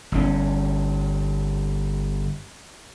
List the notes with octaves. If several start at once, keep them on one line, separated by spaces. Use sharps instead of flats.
G1 B2 C#4